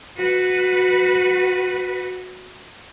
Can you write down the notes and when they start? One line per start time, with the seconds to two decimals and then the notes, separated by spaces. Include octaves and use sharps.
0.17 F#4 B4